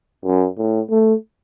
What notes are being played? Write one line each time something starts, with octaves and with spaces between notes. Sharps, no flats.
F#2
A2
A3